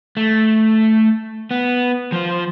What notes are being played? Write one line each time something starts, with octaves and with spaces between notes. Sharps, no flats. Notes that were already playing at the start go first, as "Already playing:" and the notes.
A3
B3
F3 C5